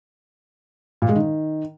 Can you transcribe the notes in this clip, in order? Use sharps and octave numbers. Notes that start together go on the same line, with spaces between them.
A#2
G#3
D#3